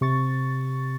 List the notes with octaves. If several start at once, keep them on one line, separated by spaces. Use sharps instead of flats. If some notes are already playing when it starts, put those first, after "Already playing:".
C3 C#6 A6